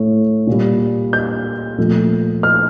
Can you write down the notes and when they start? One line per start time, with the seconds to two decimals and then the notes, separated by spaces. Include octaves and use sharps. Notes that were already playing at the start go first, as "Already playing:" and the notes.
Already playing: A2 A3
0.47 A#2 G3
1.13 G6
1.78 A#2 F3 A3
2.43 F6